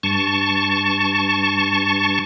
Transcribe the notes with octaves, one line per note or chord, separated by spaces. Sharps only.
G2 A5 C#6